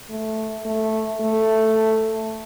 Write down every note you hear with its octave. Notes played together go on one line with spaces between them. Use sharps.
A3
A3
A3